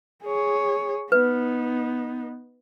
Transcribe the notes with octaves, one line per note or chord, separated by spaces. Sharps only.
G#4 C#5
B3 D#4 B4